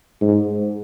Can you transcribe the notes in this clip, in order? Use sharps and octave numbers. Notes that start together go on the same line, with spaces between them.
G#2